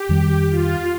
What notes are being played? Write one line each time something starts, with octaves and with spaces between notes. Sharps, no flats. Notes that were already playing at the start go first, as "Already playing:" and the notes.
Already playing: G4
F2 D#3 G3
F4